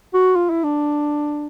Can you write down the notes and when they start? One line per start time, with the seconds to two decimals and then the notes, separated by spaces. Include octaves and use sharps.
0.14 F#4
0.35 F4
0.50 E4
0.64 D4